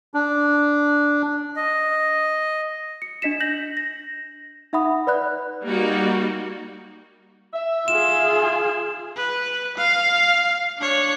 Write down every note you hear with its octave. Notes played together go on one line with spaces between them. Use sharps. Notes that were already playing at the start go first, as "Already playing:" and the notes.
D4
D#5
C#7
D4 D#5 B6 E7
G6 A#6 F#7
A#6
D#4 E5 F#5 B5 D#6
B4 D5 B5 F#6
G3 A#3 D#4 F#4
E5
F4 G#4 E7
B4
F5
D4 C#5